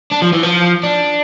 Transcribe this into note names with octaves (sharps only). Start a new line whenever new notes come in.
D4
F3
E3
F3
D4